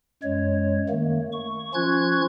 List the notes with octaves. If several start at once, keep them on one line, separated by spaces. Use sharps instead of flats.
F#2 G#3 C#5
D#3 A3 A#3
C#6
F3 C#4 F4 C#6 F#6 G#6